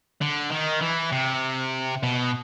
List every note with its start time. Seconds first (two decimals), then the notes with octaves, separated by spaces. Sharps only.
0.21 D3
0.52 D#3
0.82 E3
1.12 C3
2.03 B2